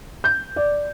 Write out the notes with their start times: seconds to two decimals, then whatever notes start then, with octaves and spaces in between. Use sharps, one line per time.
0.24 G6
0.56 D5